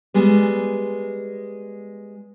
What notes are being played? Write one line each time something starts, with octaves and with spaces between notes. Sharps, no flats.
G3 G#3 B3